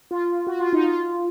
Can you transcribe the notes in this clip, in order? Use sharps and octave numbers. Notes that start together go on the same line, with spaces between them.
F4
F#4
F4
D#4
F4